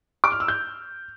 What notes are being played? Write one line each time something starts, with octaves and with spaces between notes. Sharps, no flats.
D6
F6
E6
G6